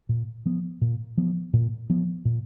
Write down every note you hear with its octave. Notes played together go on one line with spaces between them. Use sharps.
A#2
F3 B3
A#2
F3 B3
A#2
F3 B3
A#2